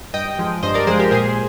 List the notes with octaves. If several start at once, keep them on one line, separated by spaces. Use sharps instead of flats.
G2 D#5 G5
F3 G#3
G2 C5 D#5
A#4 D5
F3 G#3 G#4 C5
G4 A#4
A#2 G#4 C5